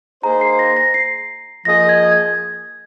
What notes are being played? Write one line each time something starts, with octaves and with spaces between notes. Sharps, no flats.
A#3 D#4 G#4 C5 A#5
C7
A#6
A#6
C7
F3 A#3 G#4 D#5 A#6
G#6
G#6